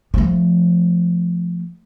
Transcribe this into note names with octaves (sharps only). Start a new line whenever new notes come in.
F3 A3